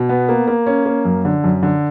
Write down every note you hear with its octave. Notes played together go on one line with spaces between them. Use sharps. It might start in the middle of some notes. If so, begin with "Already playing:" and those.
Already playing: B2
B3
A#3
A#3
C#4
A#3
F#2
D3
F#2
D3